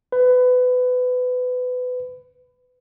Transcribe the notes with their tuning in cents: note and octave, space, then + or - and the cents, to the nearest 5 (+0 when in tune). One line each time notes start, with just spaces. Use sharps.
B4 +25